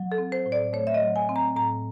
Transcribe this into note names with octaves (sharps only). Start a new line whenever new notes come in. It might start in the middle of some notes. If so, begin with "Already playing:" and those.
Already playing: F#3
A4
C4
C5
A2
D5
A3 C#5
E5
D#5
F#3
G#5
C4
A#5
A2 A#5